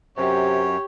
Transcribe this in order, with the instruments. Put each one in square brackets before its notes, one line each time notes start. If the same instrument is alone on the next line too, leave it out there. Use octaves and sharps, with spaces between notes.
[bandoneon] F#2 [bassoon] C3 [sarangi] G4 [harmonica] C#5